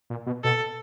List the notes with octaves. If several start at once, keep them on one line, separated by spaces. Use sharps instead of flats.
A#2
B2
B2 A4